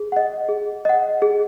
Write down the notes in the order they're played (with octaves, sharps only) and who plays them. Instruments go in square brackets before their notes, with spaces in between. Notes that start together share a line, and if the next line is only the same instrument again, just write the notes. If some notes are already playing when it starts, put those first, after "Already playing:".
Already playing: [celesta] G#4
D#5 F#5
G#4
D#5 F#5
G#4